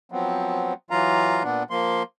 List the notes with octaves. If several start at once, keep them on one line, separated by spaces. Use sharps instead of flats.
F3 F#3 B3 C4
E3 F#3 F4 F5 A#5
A#2 B3 D4
F3 A#3 C6